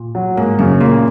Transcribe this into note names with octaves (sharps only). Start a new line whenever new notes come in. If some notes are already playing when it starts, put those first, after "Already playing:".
Already playing: A#2
F#3
G#2 A#3
F#2 C#3
A#2 A#3